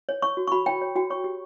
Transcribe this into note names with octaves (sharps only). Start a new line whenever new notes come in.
C#5
C#5 C#6
F#4
C#6
F#4 B5
C#5 G5
C#5
F#4 G5
C#5 C#6
G4